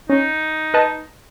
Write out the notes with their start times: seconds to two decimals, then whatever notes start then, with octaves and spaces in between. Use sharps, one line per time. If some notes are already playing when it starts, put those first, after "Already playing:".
0.10 C#4 D#4
0.74 B4 D#5 A5